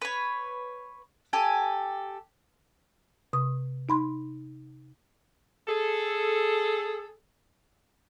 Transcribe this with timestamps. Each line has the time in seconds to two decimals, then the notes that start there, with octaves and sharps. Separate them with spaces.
0.02 B4 C#5
1.33 G4 A4 G#5
3.33 C3 D#6
3.89 D#4 B5 C6
5.67 G#4 A4